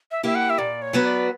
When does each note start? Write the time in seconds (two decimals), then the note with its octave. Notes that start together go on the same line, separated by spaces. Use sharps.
0.11 E5
0.23 A#3 E4 G4 E5
0.35 F#5
0.50 E5
0.58 A#2 D5
0.82 C#5
0.93 F#3 B3 F#4 B4
1.05 D5